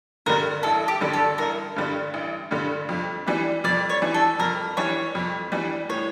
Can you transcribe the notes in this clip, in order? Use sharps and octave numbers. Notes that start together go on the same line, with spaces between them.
G2 D3 G3 A#4
A1 A4
G4
G2 D3 G3
A4
A1 A#4
G2 D3 G3
A1
G2 D3 G3
F2
E3 G3 D4
F2 D5
C#5
E3 G3 D4
A4
F2 A#4
E3 G3 D4 C#5
F2
E3 G3 D4
A2 C#5